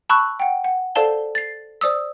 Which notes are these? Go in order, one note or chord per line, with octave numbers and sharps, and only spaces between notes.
A5 B5 C#6 E6 F#6
F#5 G5
F#5
A4 C5 D5 F5 A5 G7
A6 C7
C5 D5 D#6 E6